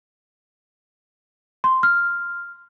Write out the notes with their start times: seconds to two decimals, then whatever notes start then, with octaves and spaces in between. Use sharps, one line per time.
1.64 C6
1.83 F6